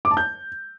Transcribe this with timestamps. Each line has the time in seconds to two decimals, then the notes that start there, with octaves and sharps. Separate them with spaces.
0.05 D6
0.11 A5
0.17 G6